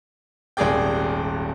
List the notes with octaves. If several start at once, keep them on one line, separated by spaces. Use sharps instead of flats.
D#1 G#1 G4 G#4 D5 G5